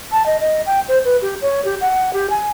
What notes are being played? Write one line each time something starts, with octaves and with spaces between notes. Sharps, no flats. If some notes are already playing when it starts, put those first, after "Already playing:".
A5
D#5
D#5
G5
C5
B4
G4
C#5
G4
F#5
G4
G#5